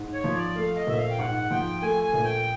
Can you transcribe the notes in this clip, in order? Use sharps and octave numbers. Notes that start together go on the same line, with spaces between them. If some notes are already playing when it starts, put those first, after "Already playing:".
Already playing: G#2
C#5
F3
D5
A3 F5
D#5
A#1 E5
F5
G5
G#2 F#5
F3 G5
A3 G#5
G#5
A#1
G5